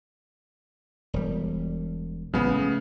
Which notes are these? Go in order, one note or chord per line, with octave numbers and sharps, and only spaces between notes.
E1 G3
A1 C#3 F3 G#3 B3
A3